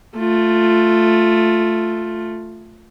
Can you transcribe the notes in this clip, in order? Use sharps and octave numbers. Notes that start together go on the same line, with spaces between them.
A3 F4